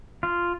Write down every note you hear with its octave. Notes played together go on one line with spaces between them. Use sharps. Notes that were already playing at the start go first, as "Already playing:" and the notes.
F4